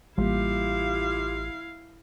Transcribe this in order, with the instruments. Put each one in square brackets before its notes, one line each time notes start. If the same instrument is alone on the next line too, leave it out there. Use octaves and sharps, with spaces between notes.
[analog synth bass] A1 [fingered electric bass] G3 A#3 [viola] E4 F5 [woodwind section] F4 G4